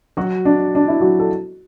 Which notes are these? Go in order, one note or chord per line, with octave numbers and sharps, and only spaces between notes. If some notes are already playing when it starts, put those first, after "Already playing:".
F#3 F#4
D4
D4
E4
F#3 F#4
A4